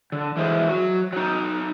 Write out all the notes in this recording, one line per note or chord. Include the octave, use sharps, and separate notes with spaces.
D3
E3 G#3 C5
F#3 F#4
F#3 D#4